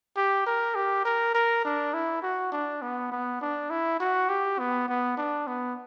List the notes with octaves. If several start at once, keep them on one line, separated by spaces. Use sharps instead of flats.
G4
A#4
G4
A#4
A#4
D4
E4
F#4
D4
B3
B3
D4
E4
F#4
G4
B3
B3
D4
B3